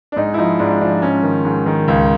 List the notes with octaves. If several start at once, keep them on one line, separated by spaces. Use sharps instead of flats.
D4
G#2 D#4
E4
F3 D#4
G#2 D4
F3 D4
G#2 C#4
D#3
G#2
D#3
C#2